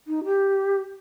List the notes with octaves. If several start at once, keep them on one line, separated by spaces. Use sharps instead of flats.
D#4
G4